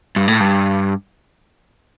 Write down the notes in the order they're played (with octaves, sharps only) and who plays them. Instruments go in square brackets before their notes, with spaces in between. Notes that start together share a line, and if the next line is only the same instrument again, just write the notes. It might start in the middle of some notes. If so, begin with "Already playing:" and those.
[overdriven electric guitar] G2
A2
G2